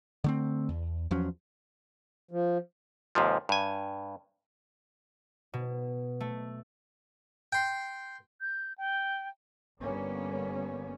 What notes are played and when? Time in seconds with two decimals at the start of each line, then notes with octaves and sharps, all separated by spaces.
0.24 D3 A3 C4
0.69 E2
1.11 E2 F3 F#3 C#4
2.31 F3
3.15 D#2 G#2 C3 F3
3.49 G2 G#5
5.53 B2
6.20 A3
7.53 G5 C6
8.41 G6
8.78 G5
9.81 G1 D3 G3 A#3 B3 C#4